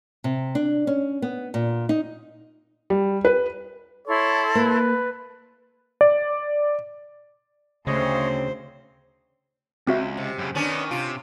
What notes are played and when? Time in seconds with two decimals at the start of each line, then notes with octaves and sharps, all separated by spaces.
0.24 C3
0.55 D4
0.87 C#4
1.22 B3
1.54 A#2
1.89 D#4
2.90 G3
3.25 B4
4.07 E4 A4 C#5 C6
4.55 A#3 B4
6.01 D5
7.87 D2 C#3 C4 C5 C#5 D#5
9.87 C#2 C4 F#4 E5
10.17 C3
10.38 F#2 C#3
10.55 D#3 B3 C#4 D4
10.91 C3 F4